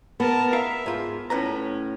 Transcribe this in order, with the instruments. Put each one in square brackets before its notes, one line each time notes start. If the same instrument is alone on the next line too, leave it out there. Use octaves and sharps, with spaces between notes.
[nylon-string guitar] B3 [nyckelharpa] A#4 A5
[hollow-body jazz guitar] A#4 F5 [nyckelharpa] E5
[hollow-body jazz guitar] G#2 F4
[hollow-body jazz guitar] A2 B4 A#5 [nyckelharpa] C#4